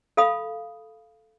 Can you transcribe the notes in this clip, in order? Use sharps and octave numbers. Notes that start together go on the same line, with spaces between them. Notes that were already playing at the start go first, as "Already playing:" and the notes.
A4 F5 B5 D#6